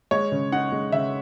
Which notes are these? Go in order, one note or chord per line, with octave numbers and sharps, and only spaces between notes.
G#3 C#5
C#3
D#4 F#5
G#3
C#3 E5